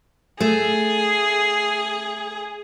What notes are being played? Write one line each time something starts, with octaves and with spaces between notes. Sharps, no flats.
A3 G#4